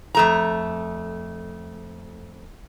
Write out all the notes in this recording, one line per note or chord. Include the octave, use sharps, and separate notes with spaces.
F2 A3 A#5